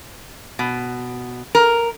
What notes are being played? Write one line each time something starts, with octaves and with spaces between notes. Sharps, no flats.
B2
A#4